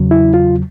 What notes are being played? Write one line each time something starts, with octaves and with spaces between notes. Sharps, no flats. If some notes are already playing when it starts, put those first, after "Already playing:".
Already playing: E2 C#3 F#3
E4
F4